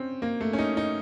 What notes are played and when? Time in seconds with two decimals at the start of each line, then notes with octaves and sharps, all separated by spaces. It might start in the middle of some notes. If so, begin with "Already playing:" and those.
Already playing: C4 C#4
0.22 A#3
0.41 A3
0.53 C#4
0.59 D#4
0.77 D#4